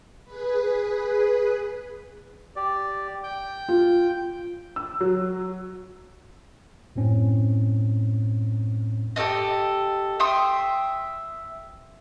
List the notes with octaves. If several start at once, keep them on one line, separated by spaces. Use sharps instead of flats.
G#4 B4
G4 D5
G5 G6
F4
E6
F#3
F#2 A2 C4 C#4
G4 A4 D5 D#5
E5 G5 C6 D#6